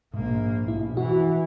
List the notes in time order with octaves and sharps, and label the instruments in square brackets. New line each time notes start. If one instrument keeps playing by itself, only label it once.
[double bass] A#1 A#3 [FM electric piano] G#2
[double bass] A#1 B2 [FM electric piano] E4
[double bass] E3 [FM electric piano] F#4